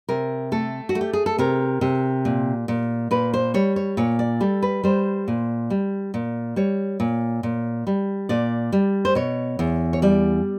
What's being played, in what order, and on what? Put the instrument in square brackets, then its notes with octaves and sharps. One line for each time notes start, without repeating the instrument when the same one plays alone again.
[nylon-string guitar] C3 A#4
A3 A4
F#4
A3
G4
G#4
A4
C3 A#4
C3
A#2
A#2
A#2 B4
C5
G3 C#5
C#5
A#2 C#5
D5
G3 A4
B4
G3 C5
A#2
G3
A#2
G3 C#5
A#2
A#2
G3
A#2 D5
G3
C5
B2 C#5
E2
C#5
G3 D5